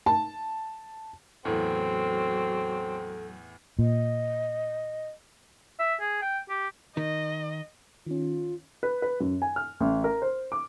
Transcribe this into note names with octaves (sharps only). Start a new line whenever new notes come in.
A5
E2 A2 F#3 C4 A4
A#2 D#5
E5
G#4
G5
G4
D#3 D#5
D#3 C#4 F4
B4
B4
F#2
G#5
F6
A1
A#4
C5
D6